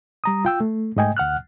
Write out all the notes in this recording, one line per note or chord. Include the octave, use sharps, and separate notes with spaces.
G3 A#5 D#6
F4 G5 E6
A3
G#2 A3 D#5 G5 G#5
D2 F#5 F6 F#6